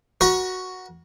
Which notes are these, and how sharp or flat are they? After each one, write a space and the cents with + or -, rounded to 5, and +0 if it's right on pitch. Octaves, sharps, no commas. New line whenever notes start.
F#4 +0 A#4 +40